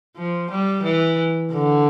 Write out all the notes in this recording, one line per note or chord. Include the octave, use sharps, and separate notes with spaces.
F3
G3
E3
D3